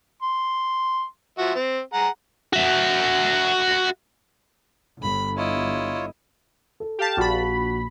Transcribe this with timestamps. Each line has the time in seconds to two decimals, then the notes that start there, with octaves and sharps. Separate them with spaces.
0.22 C6
1.38 F3 F#4 E5
1.55 C4
1.94 G#4 F#5 A#5
2.53 F#4 E5
5.03 G1 B5
5.37 E4 F4 C#5 D#5
6.80 A4
6.98 G4 F5 A5
7.17 A#1 F#4 B5